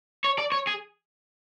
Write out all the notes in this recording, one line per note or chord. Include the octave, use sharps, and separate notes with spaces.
C#5
D5
C#5
G#4